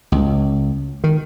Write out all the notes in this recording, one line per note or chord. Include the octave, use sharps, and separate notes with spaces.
C#2
D#3